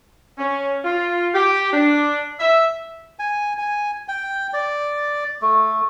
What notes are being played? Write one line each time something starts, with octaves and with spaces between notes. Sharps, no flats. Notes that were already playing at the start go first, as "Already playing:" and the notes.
C#4
F4
G4
D4
E5
G#5
G#5
G5
D5
A3